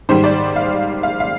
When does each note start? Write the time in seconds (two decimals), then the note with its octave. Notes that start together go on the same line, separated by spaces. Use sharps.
0.09 G#2 D#3 G3 C5
0.24 D5
0.56 F5
1.03 F5
1.20 F5